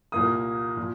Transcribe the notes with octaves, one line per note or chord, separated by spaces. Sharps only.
C2 A#2 A#3 D#6
A#2